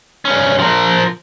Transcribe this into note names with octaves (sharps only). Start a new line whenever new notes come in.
G2 C#4
F3 A#4